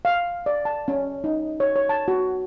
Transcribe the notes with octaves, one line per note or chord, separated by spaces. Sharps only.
F5
D5
A5
C#4
D#4
C#5
C#5
A5
F#4